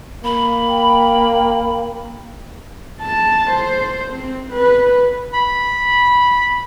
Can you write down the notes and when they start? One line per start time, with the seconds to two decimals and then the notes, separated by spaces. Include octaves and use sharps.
0.24 A#3 B5
0.68 G5
3.02 A5
3.51 C5
4.11 C4
4.52 B4
5.33 B5